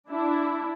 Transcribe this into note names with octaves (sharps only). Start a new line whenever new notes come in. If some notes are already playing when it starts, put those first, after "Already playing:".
D4 E4